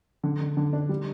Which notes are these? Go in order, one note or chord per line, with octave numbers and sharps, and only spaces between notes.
D3
D3
D3
D4
G3